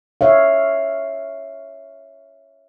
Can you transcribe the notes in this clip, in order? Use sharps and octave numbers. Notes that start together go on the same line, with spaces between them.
C#5 E5 F5